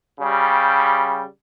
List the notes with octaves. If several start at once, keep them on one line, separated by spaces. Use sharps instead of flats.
C#3 G3